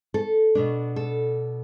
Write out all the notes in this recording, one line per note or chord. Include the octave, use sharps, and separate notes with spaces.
A4
B2 B3 D4
A4